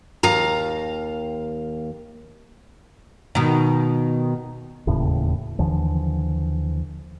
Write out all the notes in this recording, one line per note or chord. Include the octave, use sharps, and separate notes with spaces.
D#2 F5 A#5
B2 D#3
E1 D#2 A2 C#3
D#2 D3 E3 F3